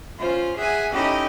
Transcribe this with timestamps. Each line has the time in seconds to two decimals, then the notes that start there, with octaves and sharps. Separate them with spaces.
0.19 C#4 F4 C5
0.57 G#4 E5 F#5 G#5
0.93 C#4 D#4 E4 G4 A4 D#5